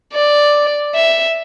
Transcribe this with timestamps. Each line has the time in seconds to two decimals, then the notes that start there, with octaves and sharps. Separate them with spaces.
0.14 D5
0.95 E5